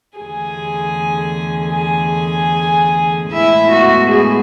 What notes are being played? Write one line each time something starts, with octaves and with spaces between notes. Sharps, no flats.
E2 D3 A3 G#4 G#5
G#4 G#5
A2 G#3 B3 E4 E5
F#4
G#4